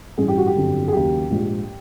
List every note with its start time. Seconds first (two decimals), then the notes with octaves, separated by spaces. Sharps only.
0.17 A1 G2 E3 G#4
0.28 G4
0.38 F#4
0.47 G4
0.56 G1 F2 D3 F#3
0.88 G#4
0.92 D#2 C#3 F#3 G4
1.30 A#1 G#2 F3